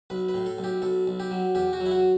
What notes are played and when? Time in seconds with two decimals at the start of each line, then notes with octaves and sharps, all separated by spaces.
0.10 B1 B4
0.28 B4
0.34 A2
0.46 A4
0.58 B1
0.64 G4
0.82 B1 A4
1.07 B1
1.20 G4
1.31 F#3
1.55 E2 G4
1.73 F#4
1.80 F#3
1.86 E4
1.91 F#4